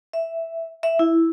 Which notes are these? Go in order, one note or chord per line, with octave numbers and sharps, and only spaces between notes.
E5
E5
E4